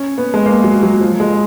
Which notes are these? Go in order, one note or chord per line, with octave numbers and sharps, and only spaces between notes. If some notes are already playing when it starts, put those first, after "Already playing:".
Already playing: C#4
B3
G#3
A#3
F#3
F#3
F3
G#3